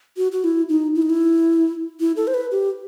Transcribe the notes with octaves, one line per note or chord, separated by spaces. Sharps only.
F#4
F#4
E4
D#4
E4
D#4
E4
E4
A4
C5
B4
G4